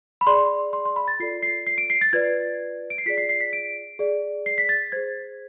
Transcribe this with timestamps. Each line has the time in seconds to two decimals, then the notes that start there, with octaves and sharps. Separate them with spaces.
0.21 B5
0.27 G#4 D5 C6
0.73 C6
0.85 C6
0.96 B5
1.08 A6
1.20 F4 A4 D5 C7
1.42 C7
1.67 C7
1.78 D7
1.90 C7
2.01 A6
2.13 F4 B4 D5 G#6
2.90 D7
2.98 C7
3.06 F4 G#4 D5 B6
3.18 C7
3.29 C7
3.41 B6
3.53 D7
3.99 G#4 D5
4.46 C7
4.58 B6
4.69 A6
4.92 G#4 C5 G#6